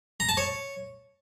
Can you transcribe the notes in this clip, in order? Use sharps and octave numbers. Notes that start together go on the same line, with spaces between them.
A#5
A5
C#5